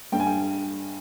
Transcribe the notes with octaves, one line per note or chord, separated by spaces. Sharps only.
G2 D3 G3 G5
G#5
G5